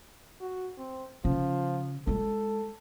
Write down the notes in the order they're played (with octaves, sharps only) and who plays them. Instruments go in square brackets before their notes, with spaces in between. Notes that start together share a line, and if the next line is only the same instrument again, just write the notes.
[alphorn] F#4
C4
[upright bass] C#3 [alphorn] F3
[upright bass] G#3 F4 [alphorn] A4